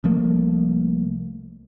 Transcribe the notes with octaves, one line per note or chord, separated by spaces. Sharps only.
C2 F3 A3 A#3